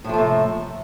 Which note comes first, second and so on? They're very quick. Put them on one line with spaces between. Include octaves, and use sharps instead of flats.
A2 F3 A3 C3